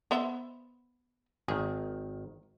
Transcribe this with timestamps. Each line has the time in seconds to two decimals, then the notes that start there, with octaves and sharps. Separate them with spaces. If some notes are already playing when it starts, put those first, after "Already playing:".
0.11 B3 C5 E5
1.48 G#1 D#3 G#4